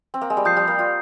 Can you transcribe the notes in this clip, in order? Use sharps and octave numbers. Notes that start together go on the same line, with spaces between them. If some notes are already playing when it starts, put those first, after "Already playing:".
C4
A#3
G#3
G3
F3 D#6 G6 C7
G3
A#3
F4